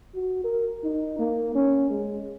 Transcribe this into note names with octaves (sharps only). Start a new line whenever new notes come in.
F#4
A#4
D#4
A#3
C#4
G#3